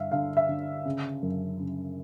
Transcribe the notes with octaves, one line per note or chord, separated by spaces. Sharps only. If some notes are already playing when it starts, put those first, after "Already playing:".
Already playing: G2 D3 E5 F5
D3 F5
E5
D3
C#3
F#2
C#3